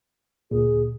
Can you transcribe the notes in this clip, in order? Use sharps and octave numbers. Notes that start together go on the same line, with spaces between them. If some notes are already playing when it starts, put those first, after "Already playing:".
D2 A#2 G#4